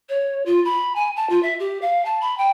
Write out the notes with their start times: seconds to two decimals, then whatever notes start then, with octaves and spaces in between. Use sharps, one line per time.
0.09 C#5
0.46 F4
0.65 B5
0.96 G#5
1.16 A5
1.29 F4
1.43 E5
1.59 G4
1.82 F5
2.05 A5
2.21 B5
2.38 G5